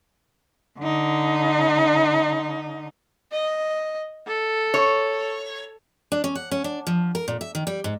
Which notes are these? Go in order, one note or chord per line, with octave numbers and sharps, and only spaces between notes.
D3 D#4
D#5
A4
C#5
D4
C#4
F#5
C#4
D4
F3
A#4
A#2
E5
D#3
G3
G#2